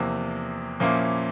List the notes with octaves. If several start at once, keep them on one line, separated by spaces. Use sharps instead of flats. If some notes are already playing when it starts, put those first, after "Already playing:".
Already playing: E2 C3 F3 A#3
A#2 F3 A#3 C#4 E4